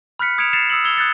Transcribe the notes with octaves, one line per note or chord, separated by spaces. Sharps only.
B5 F6 F#6 B6 C#7
D#6 G#6 C#7 D7 E7 F7
A6 C7 C#7 E7 F7
D#6 E6 C#7 F#7
E6 G#6 F7 G7
D#6 F#6 G#6 A6 C#7